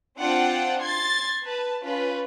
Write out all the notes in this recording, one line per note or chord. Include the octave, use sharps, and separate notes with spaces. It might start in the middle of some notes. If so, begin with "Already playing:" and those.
C4 D4 F4 C5 F#5 G5
C6 G#6 A6
B4 A5
C#4 F4 B4